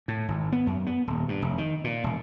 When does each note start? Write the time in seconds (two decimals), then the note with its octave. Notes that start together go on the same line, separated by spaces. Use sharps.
0.08 A2
0.28 G#1
0.52 B3
0.67 F#2
0.87 B3
1.07 D#1
1.28 G2
1.42 F1
1.58 D#3
1.84 A#2
2.04 E1